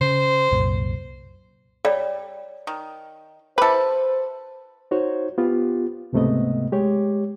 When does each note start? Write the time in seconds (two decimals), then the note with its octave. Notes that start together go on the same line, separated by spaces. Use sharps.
0.01 C#3 C5
0.51 C2 F#2 A#2
1.85 G3 C#5 D5
2.67 D#3
3.58 E4 G4 A4 B4 C5
4.91 D#4 F#4 C5 C#5
5.38 B3 F4 G4
6.13 C#2 G#2 C3 A3 B3 D#5
6.72 G#3 G4 C#5